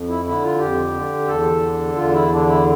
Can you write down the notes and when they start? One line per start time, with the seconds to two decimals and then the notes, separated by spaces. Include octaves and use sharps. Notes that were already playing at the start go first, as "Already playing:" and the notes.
Already playing: F2
0.08 E4
0.25 D3 E4
0.43 F4
0.59 F2 G4
0.93 D3
1.27 E2 A4
1.61 D3
1.95 E2 F4
2.12 E4
2.29 D3 D4
2.46 E4